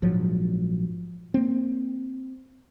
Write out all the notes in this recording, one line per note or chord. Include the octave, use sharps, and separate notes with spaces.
A#1 G#2 F3 F#3
A#3 C4